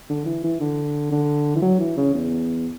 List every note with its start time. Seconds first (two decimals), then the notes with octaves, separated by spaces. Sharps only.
0.09 D3
0.26 E3
0.44 E3
0.60 D3
1.12 D3
1.56 E3
1.62 F#3
1.80 E3
1.97 C#3
2.14 E2